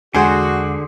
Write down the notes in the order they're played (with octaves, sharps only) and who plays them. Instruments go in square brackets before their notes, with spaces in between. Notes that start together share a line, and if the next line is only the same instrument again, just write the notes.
[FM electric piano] E2 G#3 C7 [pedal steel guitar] D3 [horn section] F#4 [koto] G#4 C5